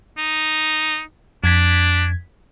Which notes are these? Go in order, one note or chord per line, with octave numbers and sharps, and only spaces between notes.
D#4
F2 D4 G#6 B6